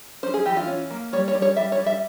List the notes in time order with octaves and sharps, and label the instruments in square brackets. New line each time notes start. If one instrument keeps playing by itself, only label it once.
[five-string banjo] C#4 C5
G#4
E3 G4
F4
C#4
A#3
G3 C#5
C#5
G3
C#5
G3 E5
C#5
G3
E5